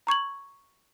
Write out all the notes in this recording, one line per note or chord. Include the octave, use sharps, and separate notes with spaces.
A#5 C#6 G#6 F#7